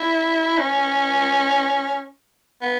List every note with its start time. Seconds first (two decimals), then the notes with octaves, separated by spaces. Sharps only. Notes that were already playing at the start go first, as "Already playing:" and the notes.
Already playing: E4
0.58 C#4
2.62 B3